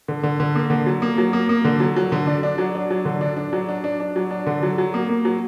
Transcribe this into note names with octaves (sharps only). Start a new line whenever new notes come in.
D3
D3
D3
A#3
D3
F#3
A#3
F#3
A#3
A#3
D3
F#3
F#3
D3
D4
D4
F#3
D4
F#3
D3
D4
D4
F#3
D4
D4
D4
F#3
D4
D3
F#3
F#3
A#3
A#3
F#3